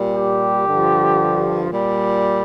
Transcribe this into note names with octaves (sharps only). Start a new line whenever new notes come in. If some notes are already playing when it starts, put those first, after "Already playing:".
Already playing: A#2 G3
G4
G2 D3 F3
A#2 G3